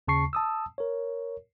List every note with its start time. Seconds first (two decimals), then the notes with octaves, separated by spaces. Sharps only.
0.08 D#2 C#3 A5 C#6 C7
0.33 A5 D#6 E6
0.78 A#4 C#5